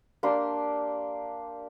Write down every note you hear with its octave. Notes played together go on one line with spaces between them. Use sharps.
A#3 D4 G4 C6